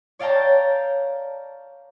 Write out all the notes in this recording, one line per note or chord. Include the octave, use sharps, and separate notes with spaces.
C#5 D5 F5 G5 A5 A#5